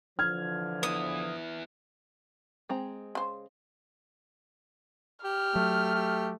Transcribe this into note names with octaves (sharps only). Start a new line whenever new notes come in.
D3 E3 F3 F6 G#6
B3 E4 D#6
G#3 C4 A#5
C#3 C5
G4 F6
F#3 A3
G4